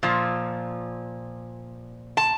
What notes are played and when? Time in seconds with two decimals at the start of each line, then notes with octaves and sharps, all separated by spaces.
0.03 A#2 F3
2.17 A5